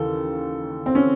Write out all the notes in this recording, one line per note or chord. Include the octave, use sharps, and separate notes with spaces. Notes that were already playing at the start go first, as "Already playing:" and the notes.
Already playing: D#2 C#3 E3 A4
C4
C#4